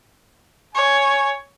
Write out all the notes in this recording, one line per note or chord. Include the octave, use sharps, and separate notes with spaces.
C#5 G#5